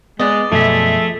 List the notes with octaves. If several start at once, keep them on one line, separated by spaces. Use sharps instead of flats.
G#3 B3 D5 D#5
F#2 B2 F3 A3 G#4 E5